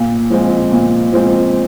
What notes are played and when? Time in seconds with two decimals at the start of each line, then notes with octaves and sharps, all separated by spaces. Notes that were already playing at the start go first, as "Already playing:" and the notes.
Already playing: A#2
0.30 F3 G#3 C4
0.72 A#2
1.12 F3 G#3 C4